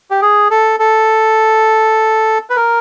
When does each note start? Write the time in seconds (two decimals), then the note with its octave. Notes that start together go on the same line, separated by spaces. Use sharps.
0.11 G4
0.22 G#4
0.51 A4
0.80 A4
2.50 B4
2.56 A#4